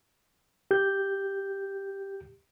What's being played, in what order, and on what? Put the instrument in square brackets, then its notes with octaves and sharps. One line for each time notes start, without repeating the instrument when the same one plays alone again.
[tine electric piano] G4 G6